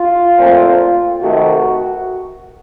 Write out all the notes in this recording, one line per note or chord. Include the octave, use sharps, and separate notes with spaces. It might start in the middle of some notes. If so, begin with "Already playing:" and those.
Already playing: F4
A#2 A3 C4
C3 D#3 A3 F#4